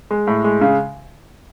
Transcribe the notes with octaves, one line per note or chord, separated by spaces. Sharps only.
G#3
A2
G#3
C#3